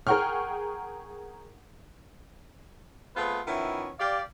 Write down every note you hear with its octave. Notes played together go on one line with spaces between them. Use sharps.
G#4 A#4 F#5 G5 C#6 F6
A3 B3 C4 F4 G#4 B4
D#3 F3 B3 C#4 E4
G4 D5 F5